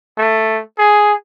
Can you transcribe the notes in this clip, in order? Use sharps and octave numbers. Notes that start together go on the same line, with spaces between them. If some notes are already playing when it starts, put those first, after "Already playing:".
A3
G#4